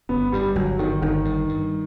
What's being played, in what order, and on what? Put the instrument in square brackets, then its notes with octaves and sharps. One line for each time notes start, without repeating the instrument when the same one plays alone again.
[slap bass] G1 [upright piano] B3
[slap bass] G2 [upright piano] G3
[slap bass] G1 [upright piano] F#3
[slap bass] G2 [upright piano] D#3
[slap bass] G1 [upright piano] D#3
[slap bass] G2
G2